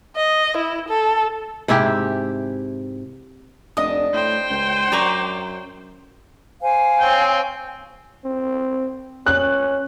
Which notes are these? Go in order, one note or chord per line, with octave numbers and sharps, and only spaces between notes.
D#5
E4
A4
G#2 C3 E4 G4
F1 D4 D#5 D#6
A2 C5 G5
C#2
F#2 D5 A#5 C#6
C5 F5 G#5
C4 C#5 G5
C4
C#4 F#6